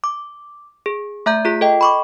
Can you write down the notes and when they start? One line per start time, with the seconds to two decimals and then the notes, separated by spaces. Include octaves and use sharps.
0.04 D6
0.86 G#4
1.26 A3 E5 A#5 G6
1.45 F4 G#4 B6
1.61 A4 D#5 G5
1.81 B5 C#6 D6